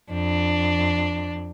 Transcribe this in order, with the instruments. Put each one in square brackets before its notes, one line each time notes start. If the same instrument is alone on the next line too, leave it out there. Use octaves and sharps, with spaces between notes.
[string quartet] F2 D4